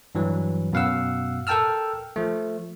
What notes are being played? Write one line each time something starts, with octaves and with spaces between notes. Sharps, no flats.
G2 E3 F#3
F#2 B2 F5 F#5 E6
A4 A#4 G5 A5 E6 F6
F3 A3